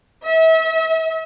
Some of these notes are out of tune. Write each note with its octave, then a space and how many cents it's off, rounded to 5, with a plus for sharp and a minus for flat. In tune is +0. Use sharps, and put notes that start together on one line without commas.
E5 -35